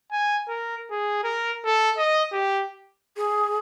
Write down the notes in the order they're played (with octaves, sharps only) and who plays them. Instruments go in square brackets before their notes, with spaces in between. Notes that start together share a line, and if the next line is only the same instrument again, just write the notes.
[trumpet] G#5
A#4
G#4
A#4
A4
D#5
G4
[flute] G#4